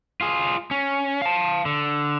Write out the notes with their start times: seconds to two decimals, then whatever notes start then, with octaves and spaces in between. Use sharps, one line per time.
0.21 F4 G#4
0.71 C#4
1.22 F5 A5
1.65 D3